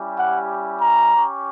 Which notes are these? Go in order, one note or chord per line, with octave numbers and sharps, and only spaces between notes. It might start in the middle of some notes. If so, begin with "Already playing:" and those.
Already playing: G3 C#4 E4 G4
F#5
A#5
C#4 G4